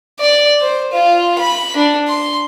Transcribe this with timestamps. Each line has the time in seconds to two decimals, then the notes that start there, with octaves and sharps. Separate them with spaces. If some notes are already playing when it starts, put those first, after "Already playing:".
0.20 D5
0.61 C5
0.93 F4
1.39 B5
1.76 D4
2.08 C6